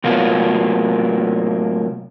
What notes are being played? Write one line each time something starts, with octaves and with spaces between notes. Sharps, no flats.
A2 C3 F#3 A#3 B3 F4